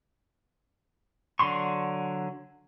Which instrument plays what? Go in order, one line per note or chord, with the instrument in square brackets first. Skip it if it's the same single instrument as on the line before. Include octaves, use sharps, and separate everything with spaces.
[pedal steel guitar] D3 F#3 C6 C#6